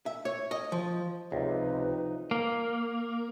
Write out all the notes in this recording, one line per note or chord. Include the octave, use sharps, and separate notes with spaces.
E5
C#5
D#5
F3
C#2 C3 F3 D#4 B4
A#3